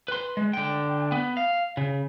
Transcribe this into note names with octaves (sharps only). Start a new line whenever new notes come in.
B4 C6
G#3
D3 G5
B3
F5
C#3